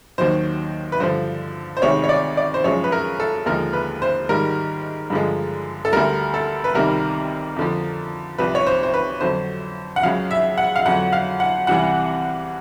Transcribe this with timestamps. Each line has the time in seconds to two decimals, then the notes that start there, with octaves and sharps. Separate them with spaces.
0.18 D#2 D#3 F#3 C5
0.92 B4
1.00 G2 D3 F3 C5
1.77 C5
1.82 D2 C3 D#3 G#3 C#5
2.04 C#5
2.09 D5
2.37 D5
2.54 C5
2.64 F#2 C#3 F3 G#3 C#5
2.84 B4
2.92 A#4
3.20 A4
3.46 D#2 D3 F3 G#3 A#4
3.73 B4
4.02 C5
4.29 G#2 D#3 G3 A#4
5.10 G2 D3 F3 G#3
5.85 A4
5.93 D2 D3 G3 A#4
6.34 A4
6.64 B4
6.75 C2 C3 D#3 G3 A#4
7.56 F2 D3 F3
8.38 C2 C3 F3 B4
8.55 C#5
8.67 C5
8.83 C5
8.94 B4
9.21 F2 D3 F#3 C5
9.96 F#5
10.03 C#2 C#3 F#3 F5
10.31 E5
10.58 F#5
10.76 F5
10.85 F2 D3 F#3 F#5
11.13 F5
11.40 F#5
11.67 C2 C3 E3 G3 F#5